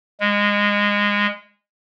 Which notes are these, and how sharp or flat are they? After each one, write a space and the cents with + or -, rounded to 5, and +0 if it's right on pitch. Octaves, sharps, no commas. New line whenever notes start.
G#3 -20